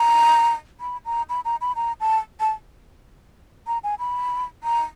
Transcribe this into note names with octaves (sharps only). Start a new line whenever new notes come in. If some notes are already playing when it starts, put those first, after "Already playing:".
Already playing: A#5
B5
A#5
B5
A#5
B5
A#5
A5
A5
A#5
G#5
B5
A#5